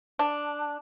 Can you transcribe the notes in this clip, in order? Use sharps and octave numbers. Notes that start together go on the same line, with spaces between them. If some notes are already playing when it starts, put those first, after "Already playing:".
D4